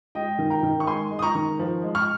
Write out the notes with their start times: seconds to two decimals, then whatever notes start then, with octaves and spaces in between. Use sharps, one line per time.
0.15 G#3 D#5 G5
0.39 D#3
0.50 G5 A#5
0.63 D#3
0.80 C#6
0.86 G#3 G#5 C6
1.11 G#3
1.19 D#6
1.22 A#5 C#6
1.35 D#3
1.59 F3
1.83 G#3
1.95 C#6 F6